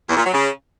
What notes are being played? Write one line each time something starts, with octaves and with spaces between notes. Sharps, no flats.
E2
A#2
F#3
C#3